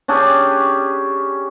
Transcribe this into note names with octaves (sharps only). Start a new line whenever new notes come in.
C#4 D4 G4 G#4